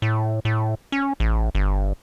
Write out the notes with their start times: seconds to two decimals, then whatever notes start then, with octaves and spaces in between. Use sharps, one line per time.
0.02 A2
0.45 A2
0.92 C#4
1.20 A1
1.55 G1